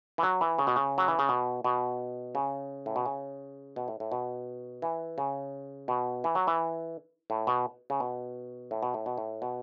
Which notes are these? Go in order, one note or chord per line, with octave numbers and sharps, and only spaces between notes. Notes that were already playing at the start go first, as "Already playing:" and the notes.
E3
F#3
E3
C#3
B2
C#3
F#3
E3
C#3
B2
B2
C#3
A2
B2
C#3
B2
A2
A2
B2
E3
C#3
B2
E3
F#3
E3
A2
B2
C#3
B2
A2
B2
A2
B2
A2
B2